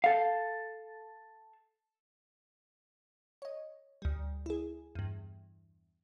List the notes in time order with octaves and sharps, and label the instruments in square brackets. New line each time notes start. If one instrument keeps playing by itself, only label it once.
[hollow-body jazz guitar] A4 F5
[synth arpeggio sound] C#5 D#5
D2 G3
E4 G#4
E2 G2